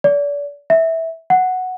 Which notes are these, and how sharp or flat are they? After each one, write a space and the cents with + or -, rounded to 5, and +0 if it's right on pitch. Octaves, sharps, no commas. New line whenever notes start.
D5 -35
E5 -15
F#5 +0